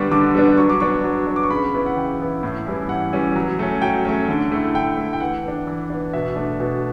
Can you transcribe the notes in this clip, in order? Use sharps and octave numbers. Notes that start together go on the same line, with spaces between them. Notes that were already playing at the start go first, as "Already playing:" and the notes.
Already playing: D3 G3 B3 D4 C#6
D3 D6
G3 B3 D4
F#3 C#6
D6
B3 D4 C#6
F#3
B3 D4
D6
C#6
C#3 B5
E3 B3 E4
F#5
C#3 G5
E3 B3 E4
A2
E3 G3 C#4 E4
A2 F#5
E3 G3 C#4 E4
F#3
A3 C#4
F#3 G5
A3 C#4
D3
A3 E4
D3 G5
A3 E4
G5
E3 F#5
B3 D4
E3
B3 D4
B2 E5
A3 D4
B2